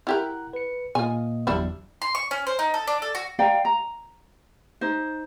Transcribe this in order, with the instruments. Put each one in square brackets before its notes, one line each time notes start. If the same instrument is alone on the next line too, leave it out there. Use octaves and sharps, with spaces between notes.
[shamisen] E4 G4 A#4 [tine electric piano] F#5 A#5 F#6
[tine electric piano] B4 C#7
[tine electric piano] A#2 A#3 D#5 [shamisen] F4 G#5
[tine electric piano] G1 E2 F#3 [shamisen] G3 D4 E4
[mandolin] C6
C#6
C#4
C5
D#4
A4
D4
A4
F#4
[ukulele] D5 F5 G5 A#5
A#5
D#4 C5